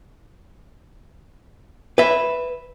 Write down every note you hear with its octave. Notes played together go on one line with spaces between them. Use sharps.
B4 E5